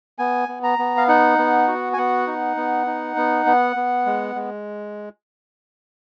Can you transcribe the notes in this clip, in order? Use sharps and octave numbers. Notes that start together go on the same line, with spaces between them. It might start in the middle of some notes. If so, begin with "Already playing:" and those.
B3 G#5
B3
A#5
B3
F5
D#4 F#5
B3
F#4
G#5
B3 F#5
D#4
B3
D#4
B3
B3
B3
G#3
G#3